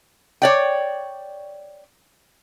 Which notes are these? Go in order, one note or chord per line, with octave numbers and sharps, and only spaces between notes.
C#5 D5 G5